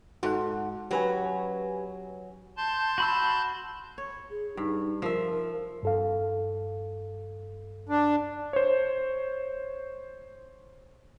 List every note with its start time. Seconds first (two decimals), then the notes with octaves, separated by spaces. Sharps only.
0.23 G#2 F#4 A4 F#5
0.91 F#3 C#4 G4 B4 G#5
2.57 A5 C6 G6
2.98 F#4 B5 E6
3.98 C#5
4.31 G#4
4.57 G2 D#4
5.02 F3 A#4 E5
5.83 G2 A4 F5
7.89 D4
8.53 C5 C#5